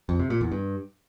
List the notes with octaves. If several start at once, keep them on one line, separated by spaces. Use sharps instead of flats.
F2
C3
A#2
E2
G2